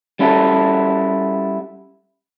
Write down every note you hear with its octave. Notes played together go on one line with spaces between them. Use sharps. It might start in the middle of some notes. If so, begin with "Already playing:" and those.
G3 C#4 E4 F#4 A4